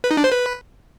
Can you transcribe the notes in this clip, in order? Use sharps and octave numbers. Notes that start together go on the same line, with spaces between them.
B4
D#4
D4
C5
B4